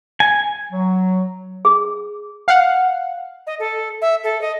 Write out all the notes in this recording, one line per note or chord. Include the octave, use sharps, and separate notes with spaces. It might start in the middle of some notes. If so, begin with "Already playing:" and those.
G#5
F#3
G#4
F5 F#5
D#5
A4
E5
A4
D#5